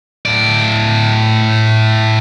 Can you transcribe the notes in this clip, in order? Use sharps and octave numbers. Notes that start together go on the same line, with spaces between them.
A2 D5